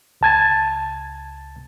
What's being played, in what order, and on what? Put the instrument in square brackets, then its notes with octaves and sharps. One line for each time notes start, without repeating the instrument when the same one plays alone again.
[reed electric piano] C#2 A5 G#6 A6